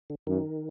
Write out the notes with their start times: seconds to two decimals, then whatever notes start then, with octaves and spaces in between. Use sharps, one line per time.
0.10 D3
0.27 F#2 D#3